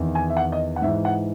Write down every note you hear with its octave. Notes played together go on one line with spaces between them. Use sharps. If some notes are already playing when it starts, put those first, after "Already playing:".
Already playing: E2 D#3
G#5
E5
F#5
D#5
F#5
G#2 E3 E5
F#5